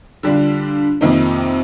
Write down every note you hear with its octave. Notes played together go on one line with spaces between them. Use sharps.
D3 G3 D4 F4
F2 C3 D#3 A#3 D#4